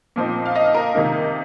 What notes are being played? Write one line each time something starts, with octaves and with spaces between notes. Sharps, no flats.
A#2 F3 C4 D#4
F5
D#5
A#4
C3 D#3 A#3 D#4